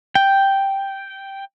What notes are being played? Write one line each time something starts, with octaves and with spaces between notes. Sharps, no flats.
G5